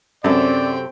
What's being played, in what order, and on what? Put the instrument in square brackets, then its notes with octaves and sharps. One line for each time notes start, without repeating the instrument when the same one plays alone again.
[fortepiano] F#2 [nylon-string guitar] C3 F#3 A4 [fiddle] C4 G5 [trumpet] D5